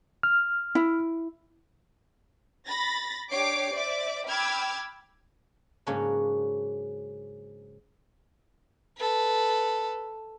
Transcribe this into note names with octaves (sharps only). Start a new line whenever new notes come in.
F6
E4
B5 A6 A#6
D4 G4 C#5 D6 C7 D7
C5 D5 E5 D6
G5 B5 D6 E6 F6 G#6
G#2 C#3 F#3 A#3 C#4 D4
A4 B4